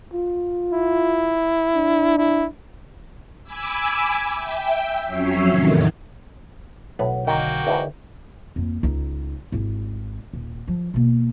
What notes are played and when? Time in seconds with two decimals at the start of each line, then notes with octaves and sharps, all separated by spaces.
0.14 F4
0.73 E4
1.75 D4
2.18 E4
3.44 G#5 B5 D6 E6
4.32 E5 G5
5.07 F2 F#3 C#4 C#5 E5 C7
5.48 E2 A2 C3 D#3
6.99 B1 A2 B3 C#5 F#5
7.27 D3 D#3 A#3 F#4 G5
7.67 E2 G#2 B2
8.56 F2 A#3
8.83 C#2 D#4
9.52 G#1 E4
10.33 D#1
10.68 F3
10.94 B2 A#3